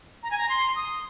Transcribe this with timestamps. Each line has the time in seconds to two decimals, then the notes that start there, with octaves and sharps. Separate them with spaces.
0.23 A#5
0.31 G#5
0.38 A#5
0.49 C6
0.76 D#6